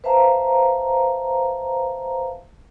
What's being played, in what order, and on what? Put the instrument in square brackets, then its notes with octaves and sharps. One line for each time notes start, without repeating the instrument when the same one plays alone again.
[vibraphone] B4 C5 E5 F5 A5 A#5